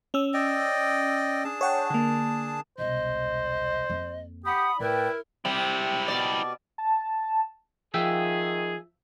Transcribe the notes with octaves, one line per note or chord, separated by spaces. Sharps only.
C#4 E6
D5 D#5 G5
D4 G#4 A5
C#5 F#5 G5
D3 A#3
E1 C2 C5 D#5
F2 A#3
G4 F#5 B5 D#6
A2 E4 A#4 B4 D5 G5
C3 G3 E4 G4
B2 D5
A5
D#3 F3 G#4 E5 G5